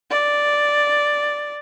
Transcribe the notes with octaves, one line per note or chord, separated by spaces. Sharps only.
D5